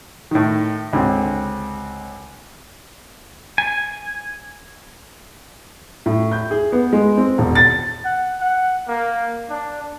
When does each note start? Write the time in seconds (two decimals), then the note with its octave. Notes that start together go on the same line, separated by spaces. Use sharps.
0.31 A2 D#3
0.93 C#2 D3 C4
3.58 G#5
6.06 A2
6.32 G6
6.51 G#4
6.72 B3
6.93 G#3
7.18 C4
7.38 E1
7.55 A6
8.05 F#5
8.40 F#5
8.88 A#3
9.50 D4